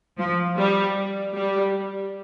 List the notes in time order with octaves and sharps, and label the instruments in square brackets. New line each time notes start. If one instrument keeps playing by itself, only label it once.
[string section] F3
G3
G3